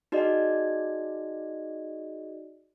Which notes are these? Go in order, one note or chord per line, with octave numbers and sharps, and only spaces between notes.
D#4 F#4 G#4 D5 D#5